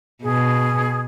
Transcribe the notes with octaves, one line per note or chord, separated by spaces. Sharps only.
B2 G#4